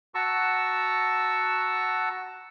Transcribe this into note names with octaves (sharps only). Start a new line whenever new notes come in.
F#4 A5 A#5 C#6 E6